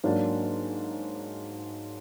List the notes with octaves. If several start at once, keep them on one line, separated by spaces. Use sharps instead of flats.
G#2 F#3 A#3 D4